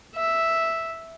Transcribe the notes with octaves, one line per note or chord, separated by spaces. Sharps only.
E5